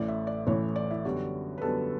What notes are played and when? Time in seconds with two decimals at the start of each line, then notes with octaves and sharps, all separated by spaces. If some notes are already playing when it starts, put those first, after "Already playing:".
Already playing: A1 A2 E3 D5
0.08 E5
0.27 D5
0.47 A1 A2 E3 C#5
0.76 D5
0.91 E4
1.05 F#2 D3 G3 B3 F#4
1.58 B4
1.62 F#2 D3 G3 B3 A4